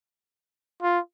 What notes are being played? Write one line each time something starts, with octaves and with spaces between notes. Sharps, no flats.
F4